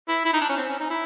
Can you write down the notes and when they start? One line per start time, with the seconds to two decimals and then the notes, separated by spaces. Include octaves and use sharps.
0.09 E4
0.25 E4
0.33 D#4
0.41 D4
0.49 C#4
0.57 C4
0.69 C#4
0.80 D#4
0.90 E4